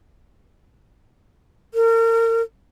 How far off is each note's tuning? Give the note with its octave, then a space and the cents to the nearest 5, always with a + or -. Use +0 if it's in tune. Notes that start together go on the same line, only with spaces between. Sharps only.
A#4 -35